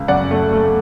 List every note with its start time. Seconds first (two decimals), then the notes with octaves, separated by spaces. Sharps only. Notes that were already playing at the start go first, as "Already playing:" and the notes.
Already playing: C#2
0.08 F#2 D5 F#5
0.31 A3
0.53 A3